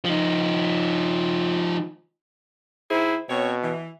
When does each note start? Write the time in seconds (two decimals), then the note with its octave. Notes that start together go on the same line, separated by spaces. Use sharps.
0.05 F3 D#4
2.91 D#3 E4 G#4 C5
3.29 B2 C4 C#5
3.63 E3